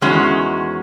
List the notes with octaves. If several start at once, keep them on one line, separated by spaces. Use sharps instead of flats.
E2 D#3 G#3 C#4 F#4